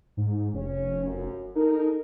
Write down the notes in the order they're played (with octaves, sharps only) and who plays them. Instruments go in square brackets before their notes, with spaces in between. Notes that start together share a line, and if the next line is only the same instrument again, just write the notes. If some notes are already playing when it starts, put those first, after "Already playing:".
[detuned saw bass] G#2
[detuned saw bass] F1 [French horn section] C#4
[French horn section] F#2
[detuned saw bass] D#4 [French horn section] A4 A#4